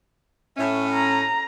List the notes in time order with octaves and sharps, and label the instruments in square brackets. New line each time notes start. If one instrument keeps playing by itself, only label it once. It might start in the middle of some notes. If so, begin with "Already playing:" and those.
[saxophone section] A2 C#4 [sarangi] E5
[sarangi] A#5